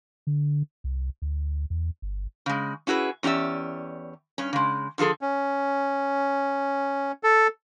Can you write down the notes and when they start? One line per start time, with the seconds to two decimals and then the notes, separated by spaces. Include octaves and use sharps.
0.27 D3
0.84 C2
1.22 D2
1.70 E2
2.02 G1
2.46 C#3 G#3
2.87 C#4 E4 F#4 G#4 B4
3.23 E2 C#4 G4 D5 E5
4.38 G2 C#4
4.53 C#3 G#3
4.98 D3 F3 F4 G#4 A4
5.21 C#4
7.23 A4